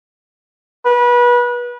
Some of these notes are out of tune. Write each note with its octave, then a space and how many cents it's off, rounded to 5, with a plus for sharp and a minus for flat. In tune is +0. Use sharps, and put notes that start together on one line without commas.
B4 -30